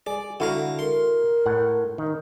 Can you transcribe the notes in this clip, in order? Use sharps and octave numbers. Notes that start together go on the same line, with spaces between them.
G#4 D5
D3 E4 F#4 F5 A#5
A#4 C6
A2 F#5
D#3